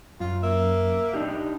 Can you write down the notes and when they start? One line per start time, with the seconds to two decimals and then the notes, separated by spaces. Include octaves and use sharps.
0.20 F#2 F4
0.43 A#3 E5
1.14 D4 D#4 G4